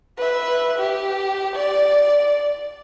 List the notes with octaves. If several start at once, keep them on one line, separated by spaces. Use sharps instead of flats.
B4 E5
G4
D5